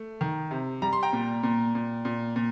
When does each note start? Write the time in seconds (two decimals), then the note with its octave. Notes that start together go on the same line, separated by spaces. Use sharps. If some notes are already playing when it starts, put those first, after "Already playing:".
Already playing: A3
0.21 D#3
0.51 C3
0.82 G3 A#5
0.93 C6
1.03 G5 A#5
1.13 A#2
1.43 A#2
1.75 A#2
2.05 A#2
2.36 A#2